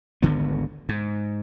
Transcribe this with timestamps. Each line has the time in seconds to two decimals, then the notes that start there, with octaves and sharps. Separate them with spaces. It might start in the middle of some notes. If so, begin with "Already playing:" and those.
0.22 G#1 D2 D3 B3
0.89 G#2